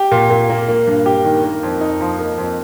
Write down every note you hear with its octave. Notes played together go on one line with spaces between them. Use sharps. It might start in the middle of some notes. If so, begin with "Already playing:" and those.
Already playing: G4
A#2
A#2
A#3
A#3
G2
G4
D#3
A#3
F2
D#4
F3
A#3
F2